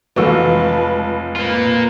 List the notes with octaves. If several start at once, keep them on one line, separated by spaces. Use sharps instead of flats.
F1 C#2 E3 F#4 A4 B4 A5
A#3 F4 B4 C5